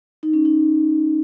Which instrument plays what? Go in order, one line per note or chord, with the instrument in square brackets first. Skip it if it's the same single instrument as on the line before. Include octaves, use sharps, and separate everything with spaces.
[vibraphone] D#4
C#4
D#4